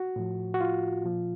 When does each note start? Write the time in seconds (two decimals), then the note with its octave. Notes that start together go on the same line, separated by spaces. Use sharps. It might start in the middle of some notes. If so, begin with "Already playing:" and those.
Already playing: F#4
0.16 A2 F3
0.54 F#4
0.61 F4
1.05 A#2 F3